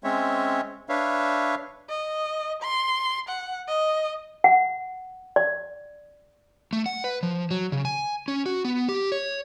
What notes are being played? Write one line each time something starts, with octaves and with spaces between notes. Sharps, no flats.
G#3 C4 C#4 C#5 E5
D4 B4 C#5 E5 F5
D#5
C6
F#5
D#5
F#5
D5
A3
F#5
B4
F3
F#3
C#3
G#5
C#4
F#4
B3
G4
C#5